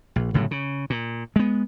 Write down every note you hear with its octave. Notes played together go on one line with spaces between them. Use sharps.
A#1
G1 A2 C#3 F#3
C#3
A#2
G#3 B3